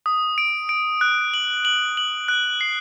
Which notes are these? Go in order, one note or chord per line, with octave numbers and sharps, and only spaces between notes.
D#6
D7
D7
F#6
F#7
F#7
F#7
F#6
C7